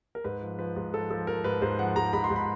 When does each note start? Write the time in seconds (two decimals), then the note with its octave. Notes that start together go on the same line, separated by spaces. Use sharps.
0.15 A#4
0.24 G#2 B4
0.42 F3
0.59 F3 B4
0.76 G#2
0.93 F3 A4
1.10 F3 A4
1.27 F3 A#4
1.44 G#2 B4
1.62 G#2 C5
1.79 F3 F#5
1.96 G#2 A#5
2.13 G#2 B5
2.24 C6
2.30 G#2
2.36 B5